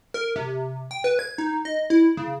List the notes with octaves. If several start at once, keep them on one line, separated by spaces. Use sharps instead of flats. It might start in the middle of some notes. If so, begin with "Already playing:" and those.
A#4
C3
G5
B4
G#6
D#4
D#5
E4
C#3